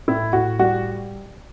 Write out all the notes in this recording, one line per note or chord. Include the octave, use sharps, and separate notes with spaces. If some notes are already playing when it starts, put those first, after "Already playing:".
A2 E4
A2 F#4
G3 F#4